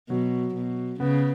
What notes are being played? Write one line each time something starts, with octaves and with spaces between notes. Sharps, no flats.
B2 F#3
B2
C#3 B3